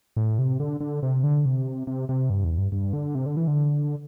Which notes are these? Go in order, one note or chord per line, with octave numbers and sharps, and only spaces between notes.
A2
C3
D3
D3
C3
D3
C3
C3
C3
G2
E2
G2
G2
D3
C3
D3
E3
D3